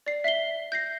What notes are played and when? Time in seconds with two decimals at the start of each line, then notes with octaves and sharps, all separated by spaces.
0.06 D5 C7
0.24 E5 B6 C7 G7
0.72 G6 A#6 C7